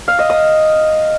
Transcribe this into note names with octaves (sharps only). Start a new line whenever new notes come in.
F5
D#5
D#6